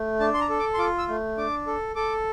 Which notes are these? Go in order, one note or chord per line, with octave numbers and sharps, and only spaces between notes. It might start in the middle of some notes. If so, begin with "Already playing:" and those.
Already playing: A3
D4 A5
C6
A#5
A4
D6
C6
F4 D6
E6
A3
D4 D6
A4
A4 D6